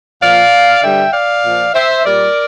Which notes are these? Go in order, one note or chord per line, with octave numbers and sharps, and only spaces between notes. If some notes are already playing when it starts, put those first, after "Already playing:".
A#2 F3 D5 F5
G2 D3 G3 E5 G5
D5 F5
A#2 F3
C5 E5
A#2 G3 A#4 D5